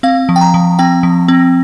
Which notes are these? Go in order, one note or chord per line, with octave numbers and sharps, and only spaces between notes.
C4 F5
F3
G5
A#5
F3
C4 G5
F3
C4